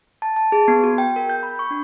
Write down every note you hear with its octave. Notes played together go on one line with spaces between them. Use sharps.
A5
A5
G#4
B3
F#4
G5
A#4
G6
B5
C#6
D4